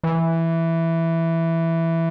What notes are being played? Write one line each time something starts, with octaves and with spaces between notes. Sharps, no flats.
E3